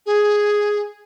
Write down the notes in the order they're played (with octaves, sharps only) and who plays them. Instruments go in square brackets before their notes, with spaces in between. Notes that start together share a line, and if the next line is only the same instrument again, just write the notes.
[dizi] G#4